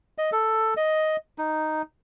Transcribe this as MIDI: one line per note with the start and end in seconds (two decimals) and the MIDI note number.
0.18 0.30 75
0.32 0.74 69
0.77 1.16 75
1.38 1.82 63